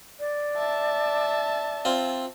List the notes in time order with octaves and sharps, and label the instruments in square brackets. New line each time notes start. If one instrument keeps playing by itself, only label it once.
[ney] D5
[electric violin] E5 A5
[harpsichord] C4 F4